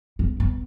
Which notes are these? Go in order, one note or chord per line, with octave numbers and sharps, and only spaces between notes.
B3
B3